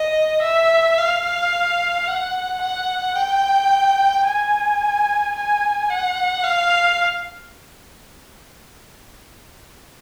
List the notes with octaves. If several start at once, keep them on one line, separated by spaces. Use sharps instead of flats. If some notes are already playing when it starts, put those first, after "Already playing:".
Already playing: D#5
E5
F5
F#5
F#5
G5
G#5
G#5
F#5
F5